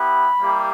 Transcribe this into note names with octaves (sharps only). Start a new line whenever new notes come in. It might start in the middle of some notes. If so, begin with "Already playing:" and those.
Already playing: B3 E4 G4 B5
G3 A#3 E4 G4